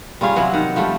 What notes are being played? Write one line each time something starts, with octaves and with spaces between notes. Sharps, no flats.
G3 C#4 F4 G#4
C3 E3 F#3 B3
D#3 F#5
F3 G3 A3